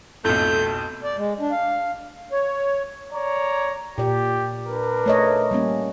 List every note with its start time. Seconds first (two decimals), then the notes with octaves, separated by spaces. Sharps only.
0.25 B1 F2 A3 G6
1.03 D5
1.16 G#3
1.40 D4
1.52 F5
2.32 C#5
3.12 C#5 D5 A#5
3.98 A#2 G4 D5
4.66 D4 A#4 B4
5.06 A3 C#5 D#5
5.51 G3 A#3 C#4